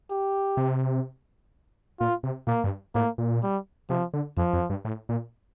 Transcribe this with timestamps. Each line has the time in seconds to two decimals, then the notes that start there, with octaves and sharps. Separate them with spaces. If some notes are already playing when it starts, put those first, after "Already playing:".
0.11 G4
0.57 C3
2.00 A#2 F4
2.23 C3
2.47 A#2 A#3
2.64 G2
2.95 A2 A#3
3.18 A#2
3.43 G3
3.90 C3 F3
4.14 D3
4.37 F2 F3
4.53 F2
4.70 G2
4.85 A2
5.09 A#2